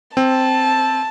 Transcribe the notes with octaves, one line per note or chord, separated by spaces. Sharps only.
C4 A5